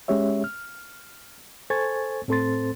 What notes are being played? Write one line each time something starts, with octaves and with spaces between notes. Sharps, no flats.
G#3 C#4 G4 C#5 E5
F6
A4 C5 G#5 C#6 G#6 A6
A2 C4 A4 C5 C6 A6